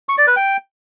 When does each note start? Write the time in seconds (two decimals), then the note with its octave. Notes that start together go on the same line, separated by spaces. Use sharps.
0.09 C#6
0.18 D5
0.27 B4
0.36 G5